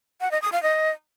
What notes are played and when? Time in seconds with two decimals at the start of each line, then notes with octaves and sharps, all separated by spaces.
0.21 F#5
0.31 D#5
0.42 D#6
0.52 F5
0.63 D#5